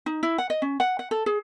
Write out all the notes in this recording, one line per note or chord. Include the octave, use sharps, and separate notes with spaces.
D#4
E4
F#5
D#5
C#4
F#5
F#5
A4
G#4